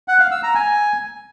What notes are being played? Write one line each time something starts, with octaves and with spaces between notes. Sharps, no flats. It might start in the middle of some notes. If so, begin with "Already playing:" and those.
F#5
F5
E6
A#5
G#5